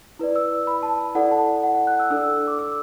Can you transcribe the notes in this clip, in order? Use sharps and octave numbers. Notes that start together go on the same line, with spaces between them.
E4 B4 D5
E6
B5
A5
E4 A4 D5 F#5
A5
F#5
F#5
F#6
E6
D4 A4 D5 E6
D6
E6